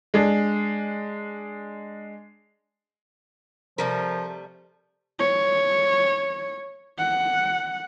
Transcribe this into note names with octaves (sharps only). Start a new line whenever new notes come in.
G#3 D4
C3 F3 G3 A3 A#4
C#5
F#5